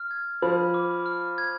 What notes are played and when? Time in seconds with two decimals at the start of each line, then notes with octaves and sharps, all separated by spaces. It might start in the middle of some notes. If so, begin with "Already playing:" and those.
Already playing: F6
0.11 G#6
0.42 F3 B5
0.74 D6
1.06 F6
1.38 G#6